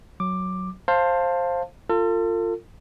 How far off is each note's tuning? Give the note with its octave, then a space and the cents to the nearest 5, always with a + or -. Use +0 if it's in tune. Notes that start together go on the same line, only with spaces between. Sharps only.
F#3 +0 D6 +10
C5 +15 F5 +0 A5 +15
F4 +0 A4 +40